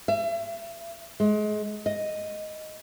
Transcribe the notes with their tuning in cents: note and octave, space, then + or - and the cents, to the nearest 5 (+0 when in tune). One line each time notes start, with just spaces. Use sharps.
E5 +40
G#3 +30
D#5 +0